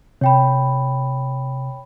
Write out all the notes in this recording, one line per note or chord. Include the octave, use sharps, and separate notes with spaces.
C3 C#5 G5 B5